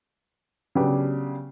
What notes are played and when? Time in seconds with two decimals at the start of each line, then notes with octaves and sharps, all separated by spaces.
0.75 C#3 F#3 B3 D4 G4